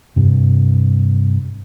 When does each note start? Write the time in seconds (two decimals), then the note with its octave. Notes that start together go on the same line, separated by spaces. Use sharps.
0.16 G2 C3